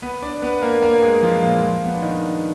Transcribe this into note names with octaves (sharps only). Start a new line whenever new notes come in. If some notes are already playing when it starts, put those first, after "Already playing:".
B3 B4
D4 D5
B3 B4
A#3 A#4
A#3 A#4
G#3 G#4
F3 F4
A#2 A#3
F3 F4
B3
D4
D#3 D#4